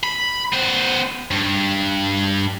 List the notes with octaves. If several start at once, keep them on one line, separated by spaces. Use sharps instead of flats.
B5
B3 C5
G2